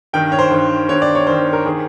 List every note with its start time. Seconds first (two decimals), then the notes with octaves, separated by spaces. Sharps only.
0.13 G2 D#3 G5
0.32 C#5
0.39 C5
0.51 G2 D#3
0.89 G2 D#3 C#5
1.02 D5
1.15 C#5
1.27 G2 D#3 C5
1.53 A#4
1.66 D#3 G#4